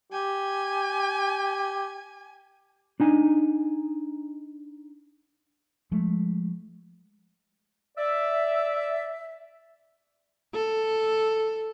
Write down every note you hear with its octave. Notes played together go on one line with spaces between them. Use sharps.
G4 G#5
D4 D#4 G#5
F3 G#3 A3
D5 E5
A4